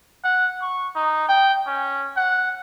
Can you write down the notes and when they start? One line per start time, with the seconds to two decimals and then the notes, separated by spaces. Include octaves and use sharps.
0.24 F#5
0.62 C#6
0.95 D#4
1.28 G5
1.67 C#4
2.17 F#5